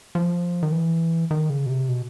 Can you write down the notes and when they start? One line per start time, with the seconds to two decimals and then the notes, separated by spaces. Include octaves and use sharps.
0.15 F3
0.63 D#3
0.72 E3
1.31 D#3
1.50 C#3
1.66 B2
1.69 C3
1.89 B2